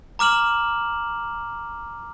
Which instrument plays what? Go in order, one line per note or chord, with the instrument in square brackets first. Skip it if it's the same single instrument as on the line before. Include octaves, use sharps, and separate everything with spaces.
[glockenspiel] A#5 D6 F6 E7 F#7